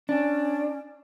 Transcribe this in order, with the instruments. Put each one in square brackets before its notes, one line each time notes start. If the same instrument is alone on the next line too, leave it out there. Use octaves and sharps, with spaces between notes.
[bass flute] C#4 [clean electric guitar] D4